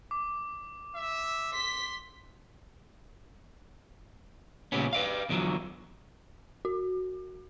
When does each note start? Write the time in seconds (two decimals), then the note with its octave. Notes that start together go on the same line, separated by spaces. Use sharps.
0.11 D6
0.95 E5
1.53 C6 B6
4.72 A#2 C#3 E3 G3 B3 C#4
4.93 B4 D5 F5
5.29 E2 D3 F3 F#3
6.65 F#4